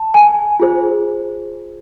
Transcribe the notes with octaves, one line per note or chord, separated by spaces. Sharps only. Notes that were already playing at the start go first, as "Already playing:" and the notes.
Already playing: A5
G#5
F4 G#4 C5